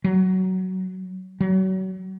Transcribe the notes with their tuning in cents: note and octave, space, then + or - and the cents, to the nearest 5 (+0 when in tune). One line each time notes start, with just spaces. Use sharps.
F#3 +15
F#3 +35